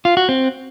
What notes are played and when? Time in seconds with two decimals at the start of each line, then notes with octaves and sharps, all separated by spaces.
0.05 F4
0.17 F#4
0.29 C4